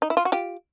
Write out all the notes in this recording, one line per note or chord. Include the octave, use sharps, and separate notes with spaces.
D#4
E4
F4
F#4
F4 G4